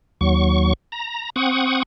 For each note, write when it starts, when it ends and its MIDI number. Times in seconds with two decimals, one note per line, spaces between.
0.21 0.73 39
0.21 0.73 54
0.21 0.73 85
0.92 1.30 82
1.36 1.83 60
1.36 1.83 78
1.36 1.83 85
1.36 1.83 87